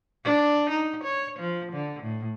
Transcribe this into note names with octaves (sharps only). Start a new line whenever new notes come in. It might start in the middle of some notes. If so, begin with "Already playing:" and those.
D4
D#4
C#5
F3
D3
A2